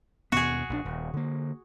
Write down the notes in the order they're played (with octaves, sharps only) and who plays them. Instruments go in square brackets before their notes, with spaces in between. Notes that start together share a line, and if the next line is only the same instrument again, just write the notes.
[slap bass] D#2 B2 B3 [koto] F#4 G#4
[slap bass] A#1 G3 D4
D#1
D3 A#3